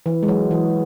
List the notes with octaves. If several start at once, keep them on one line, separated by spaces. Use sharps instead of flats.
E3
G#3
F#3
E3